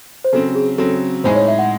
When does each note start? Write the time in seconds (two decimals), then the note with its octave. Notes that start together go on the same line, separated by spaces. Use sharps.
0.24 C5
0.33 C#3 F#3 C4 A4
0.55 G#4
0.78 C#3 F#3 C4 A4
1.24 A2 G#3 D#4 G#4 C5
1.35 C#5
1.48 E5
1.59 F#5